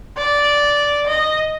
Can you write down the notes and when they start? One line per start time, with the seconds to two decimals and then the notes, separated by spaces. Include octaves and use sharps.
0.18 D5
1.07 D#5